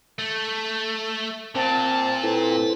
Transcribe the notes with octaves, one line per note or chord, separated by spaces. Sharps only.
A3
A#2 C4 A5
E4 A4 B4